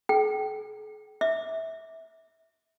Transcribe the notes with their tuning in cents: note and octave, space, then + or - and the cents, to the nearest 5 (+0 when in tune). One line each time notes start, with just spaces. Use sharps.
G#4 +45 G5 -25
E5 -20 D6 +0